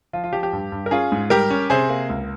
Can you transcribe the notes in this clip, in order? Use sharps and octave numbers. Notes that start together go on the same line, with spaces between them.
F3 F4
F4
F3 G4
G4
G2
G2
A#4
C#4 F4 G#4
G#2
G3 G4 A#4
C#4
C3 G#4 C5
A#3
C#2